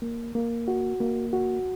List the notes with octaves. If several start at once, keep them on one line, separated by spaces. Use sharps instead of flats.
A#3
A#3
F#4
A#3
F#4